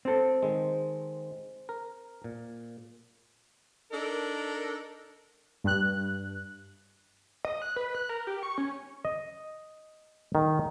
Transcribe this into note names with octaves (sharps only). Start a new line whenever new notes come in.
C4 A4
D#3 G#3
A#4
A#2
D4 D#4 A4 A#4
G2 F#6
D#5
F#6
B4
F#6
A#4
G4
C#6
C#4
D#5
D#3